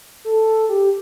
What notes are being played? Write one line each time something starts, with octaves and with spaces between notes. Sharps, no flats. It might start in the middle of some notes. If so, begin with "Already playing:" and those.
A4
G4